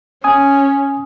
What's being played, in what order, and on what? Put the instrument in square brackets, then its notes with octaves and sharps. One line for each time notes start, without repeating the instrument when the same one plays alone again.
[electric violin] C#4 [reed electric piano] G#5 D#6